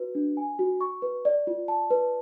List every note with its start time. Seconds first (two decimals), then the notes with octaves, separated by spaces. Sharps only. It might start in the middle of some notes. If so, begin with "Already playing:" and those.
Already playing: F#4 B4
0.15 D4
0.37 G#5
0.59 F#4
0.81 C#6
1.02 B4
1.25 D5
1.47 F4
1.68 A5
1.90 B4